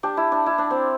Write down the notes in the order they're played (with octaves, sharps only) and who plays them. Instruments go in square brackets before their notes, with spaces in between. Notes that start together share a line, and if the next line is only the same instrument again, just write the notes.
[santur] D4 G4
E4
D4
E4
D4
C4